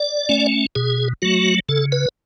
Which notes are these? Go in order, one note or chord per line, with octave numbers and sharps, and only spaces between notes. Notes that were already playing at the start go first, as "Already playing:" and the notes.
Already playing: D5
A3 C#4
B2 G#4
F#3 A3 F#4
C#3 A4
B4